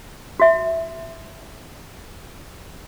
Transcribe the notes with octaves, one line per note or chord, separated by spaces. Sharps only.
F#4 E5